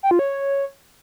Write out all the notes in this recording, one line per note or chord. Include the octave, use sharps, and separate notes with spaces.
G5
F4
C#5